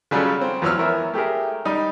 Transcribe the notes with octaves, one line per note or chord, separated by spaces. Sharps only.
C#3 F#3 G3 F4 A4
C4
E2 F3 F#3 C#5 E6 F6
E3 B3 A#4 C#5 E5
A3 G4 G#4 A#4
G3 D#4